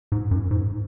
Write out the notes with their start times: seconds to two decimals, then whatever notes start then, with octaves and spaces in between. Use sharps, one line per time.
0.12 G#2
0.31 F#2
0.51 G#2